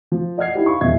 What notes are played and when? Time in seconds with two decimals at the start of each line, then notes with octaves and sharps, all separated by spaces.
0.12 F3
0.38 D5 D#5 F#5 F6 G#6 C7
0.54 D#4 E4 G4 C5
0.66 F5 B5 C#6
0.81 D#1 E2 D#5 E5 G#6